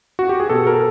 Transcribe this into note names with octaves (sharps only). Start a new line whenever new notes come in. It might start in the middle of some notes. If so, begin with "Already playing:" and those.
F#4
G4
G#4
B2 A4
A#4